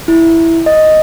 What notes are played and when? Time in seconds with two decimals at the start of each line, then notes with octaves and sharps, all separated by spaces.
0.08 E4
0.66 D#5